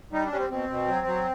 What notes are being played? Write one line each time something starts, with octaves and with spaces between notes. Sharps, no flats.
G3 D#4
D4
G3 C#4
C4
B2 C4
B2
F#3
F#3